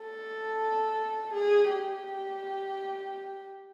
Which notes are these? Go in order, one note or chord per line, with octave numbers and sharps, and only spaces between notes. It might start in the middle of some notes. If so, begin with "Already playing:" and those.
Already playing: A4
G#4
G4